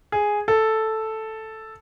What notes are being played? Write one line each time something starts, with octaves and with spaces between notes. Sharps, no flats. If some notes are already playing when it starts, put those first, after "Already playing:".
G#4
A4